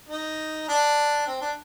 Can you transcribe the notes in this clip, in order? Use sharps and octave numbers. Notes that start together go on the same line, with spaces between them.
D#4
D4
C4
D4